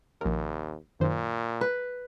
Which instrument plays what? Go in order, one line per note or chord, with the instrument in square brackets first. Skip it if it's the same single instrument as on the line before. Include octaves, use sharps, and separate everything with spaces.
[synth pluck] A#1 A#4 [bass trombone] D#2
[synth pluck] F#2 D#3 C5 [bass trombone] A#2
[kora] B4